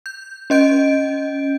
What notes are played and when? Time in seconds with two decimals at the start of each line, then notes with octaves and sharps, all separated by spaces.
0.06 G6
0.50 C#4 D#5 G6 D7